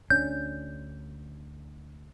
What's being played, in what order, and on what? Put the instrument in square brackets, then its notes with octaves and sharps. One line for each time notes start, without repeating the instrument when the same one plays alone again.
[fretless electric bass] D2 C#4 D4 [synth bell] G6